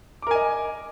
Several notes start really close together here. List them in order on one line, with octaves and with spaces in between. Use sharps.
D6 A#4 G#5 D#5